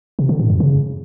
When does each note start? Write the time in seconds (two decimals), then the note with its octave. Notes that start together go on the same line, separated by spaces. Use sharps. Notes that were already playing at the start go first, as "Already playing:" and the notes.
0.19 C3
0.29 D3
0.39 A2
0.50 F#2
0.60 C#3